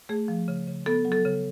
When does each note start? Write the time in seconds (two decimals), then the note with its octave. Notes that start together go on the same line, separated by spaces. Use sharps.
0.09 A3 G#4
0.28 F3
0.48 C#3
0.67 C#3
0.86 B3 A4
1.05 F#3
1.12 A4
1.25 C#3